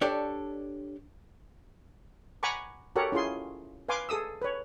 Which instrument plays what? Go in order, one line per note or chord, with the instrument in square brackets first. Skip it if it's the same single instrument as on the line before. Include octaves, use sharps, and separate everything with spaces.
[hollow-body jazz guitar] D4 G4 A4 C#5 D5
[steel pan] F#5 G#5 A#5 B5 C#6 D6
F#4 G4 A4 A#4 C#5 F#5
C#4 E4 F4 G#4 C6
B4 F5 G#5 C6 D6
G#4 A4 D#6 E6
B4 C#5